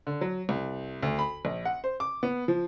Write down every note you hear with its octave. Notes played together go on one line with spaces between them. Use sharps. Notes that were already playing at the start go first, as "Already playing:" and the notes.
D3
F#3
C2
D2
B5
A#1
F#5
C5
D6
B3
F3